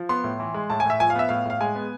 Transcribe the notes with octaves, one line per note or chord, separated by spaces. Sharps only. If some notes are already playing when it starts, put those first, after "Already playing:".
Already playing: F3
B3 C6
A2
E3
G#3
A2 A5
G#5
A2 E5
F3 G#5
F5
B3 E5
A2 F5
A2 F5
G#3 G#5
B3